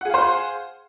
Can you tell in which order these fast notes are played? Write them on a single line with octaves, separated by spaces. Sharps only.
F#5 G#4 F5 C5